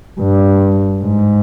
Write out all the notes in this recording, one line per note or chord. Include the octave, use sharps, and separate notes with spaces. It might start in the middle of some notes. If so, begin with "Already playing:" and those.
G2
G#2